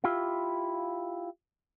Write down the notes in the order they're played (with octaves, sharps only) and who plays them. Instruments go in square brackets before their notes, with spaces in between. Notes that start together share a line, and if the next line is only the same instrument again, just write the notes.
[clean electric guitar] E4 F4 G4 F5